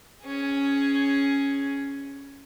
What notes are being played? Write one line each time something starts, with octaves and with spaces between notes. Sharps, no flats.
C#4 G#4